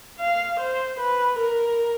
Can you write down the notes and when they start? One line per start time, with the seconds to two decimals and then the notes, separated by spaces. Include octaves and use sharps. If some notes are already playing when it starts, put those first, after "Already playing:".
0.20 F5
0.60 C5
1.00 B4
1.39 A#4